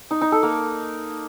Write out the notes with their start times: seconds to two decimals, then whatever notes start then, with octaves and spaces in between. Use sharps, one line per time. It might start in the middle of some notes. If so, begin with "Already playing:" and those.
0.11 D#4
0.21 D#4
0.32 A4
0.43 A#3